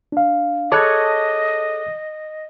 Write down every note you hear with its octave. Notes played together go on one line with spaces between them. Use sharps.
D4 F5
G#4 A4 C#5 D#5 D6 F#6